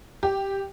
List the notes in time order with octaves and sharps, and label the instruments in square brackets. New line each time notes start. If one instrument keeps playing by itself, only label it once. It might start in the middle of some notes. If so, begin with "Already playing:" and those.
[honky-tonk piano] G4